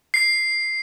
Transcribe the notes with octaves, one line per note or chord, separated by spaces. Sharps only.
C7